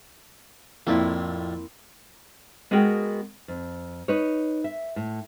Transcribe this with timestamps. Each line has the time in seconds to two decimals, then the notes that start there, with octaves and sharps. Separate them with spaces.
0.87 F2 A2 A#3 C4 E4 D5
2.71 G#3 B3 F#4 G#4 A#4 G5
3.48 F2
4.08 D#4 B4 C#5
4.64 E5
4.96 A2